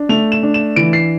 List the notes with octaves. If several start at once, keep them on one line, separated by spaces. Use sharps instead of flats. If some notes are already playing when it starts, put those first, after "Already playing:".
Already playing: D4
A3 F7
E7
D4
E7
E3 D7
C7